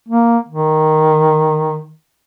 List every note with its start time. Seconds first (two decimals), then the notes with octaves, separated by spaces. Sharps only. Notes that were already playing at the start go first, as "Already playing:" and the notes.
0.08 A#3
0.48 D#3